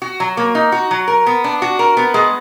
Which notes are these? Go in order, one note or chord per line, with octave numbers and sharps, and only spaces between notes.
F#4
F#3
A#3
D#4
F#4
F#3
A#4
B3
D4
F#4
A#4
B3
G#3